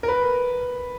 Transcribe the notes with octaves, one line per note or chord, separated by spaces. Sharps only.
A#4
B4